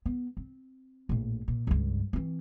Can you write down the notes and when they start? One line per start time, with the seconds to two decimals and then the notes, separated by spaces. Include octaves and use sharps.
0.06 B3
0.37 C4
1.09 A#1 A2
1.48 A#2
1.67 C#2 G2
2.13 E3 C4